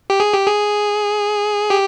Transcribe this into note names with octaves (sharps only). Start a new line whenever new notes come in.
G4
G#4
G4
G#4
G4